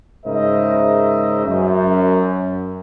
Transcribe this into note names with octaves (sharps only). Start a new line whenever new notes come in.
G#2 C#3 A#4 C5 D#5 E5
F#2